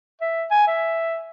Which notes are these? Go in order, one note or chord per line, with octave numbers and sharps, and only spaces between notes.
E5
G#5
E5